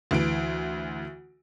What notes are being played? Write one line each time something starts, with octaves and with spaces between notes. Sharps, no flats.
D2 E3 D7